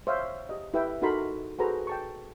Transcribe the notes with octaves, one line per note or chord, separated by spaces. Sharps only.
C5 C#5 E5 F5
G4 D#5
E4 G4 B4 E5 G5
D#4 F#4 A4 A#4 B5 C6
F#4 G#4 A4 B4 C5 A#5
G5 A5 C#6